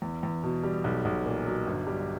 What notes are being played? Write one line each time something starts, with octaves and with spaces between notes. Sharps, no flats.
E2
E2
B2
G3
B1
B1
A#2
F#3
G1
G3